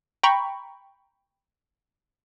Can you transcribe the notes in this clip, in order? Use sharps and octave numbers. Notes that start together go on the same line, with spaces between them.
G5 A#5 B5 C#6